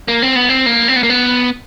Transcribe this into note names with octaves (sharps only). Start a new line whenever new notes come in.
A#3
C4
B3
C4
A#3
C4
B3
A#3
B3